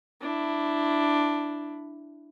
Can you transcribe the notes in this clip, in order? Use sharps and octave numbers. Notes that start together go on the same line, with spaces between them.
D4 E4